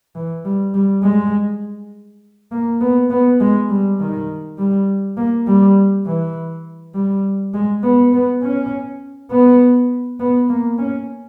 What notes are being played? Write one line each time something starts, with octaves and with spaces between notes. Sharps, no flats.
E3
G3
G3
G#3
A#3
B3
B3
G#3
G3
D#3
G3
A#3
G3
E3
G3
G#3
B3
B3
C#4
B3
B3
A#3
C#4